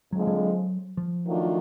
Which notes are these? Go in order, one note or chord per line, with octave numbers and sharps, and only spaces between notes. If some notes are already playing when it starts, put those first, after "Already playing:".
F2 D3 F3 F#3 G#3
F#3
F3
D#3 F#3 A3 D4 F4